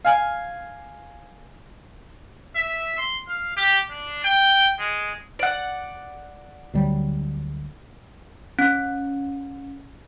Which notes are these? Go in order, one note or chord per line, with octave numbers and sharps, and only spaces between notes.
F5 G#5
E5
C6
F5
G4
D4
G5
G#3
D5 F#5
D2 F#3 G3
C#4